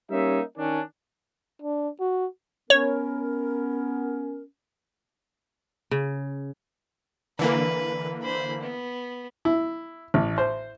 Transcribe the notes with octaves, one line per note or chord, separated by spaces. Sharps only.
G3 A#3 C#4 D#4 E5
D#3 C#4 D4
D4
F#4
B3 C#4 A#4 C#5
C#3
D3 E3 A#3 B4
C5 B5
B3
E4
A1
C5